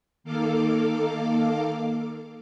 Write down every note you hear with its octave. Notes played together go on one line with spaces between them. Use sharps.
D#3 A#3 A4 F5 D6